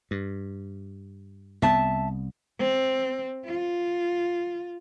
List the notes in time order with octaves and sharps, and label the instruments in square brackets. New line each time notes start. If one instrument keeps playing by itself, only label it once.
[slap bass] G2
[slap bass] C2 B3 [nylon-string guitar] E5 A5
[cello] C4
F4